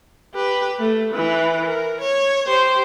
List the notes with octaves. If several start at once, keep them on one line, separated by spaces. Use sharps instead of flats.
G4 B4
A3
E3 B4
A#4
C#5
G4 C5